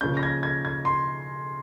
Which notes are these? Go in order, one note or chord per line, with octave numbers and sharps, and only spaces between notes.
C#3 F3 A#3 C#4 G6
A#6
G#6
G#6
G#6
C6